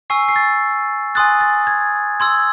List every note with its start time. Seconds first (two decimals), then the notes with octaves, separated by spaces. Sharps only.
0.10 G#5 C#6 E6 C7
0.29 C7
0.36 A6
1.15 G#5 C6 D#6 F#6 A6
1.41 A6
1.67 G#6
2.20 C6 E6 G#6